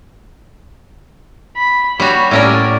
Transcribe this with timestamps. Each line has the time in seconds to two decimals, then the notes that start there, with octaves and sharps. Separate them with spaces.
1.57 B5
2.00 G3 F#4 C#5
2.31 A2 C#4 A#4 D5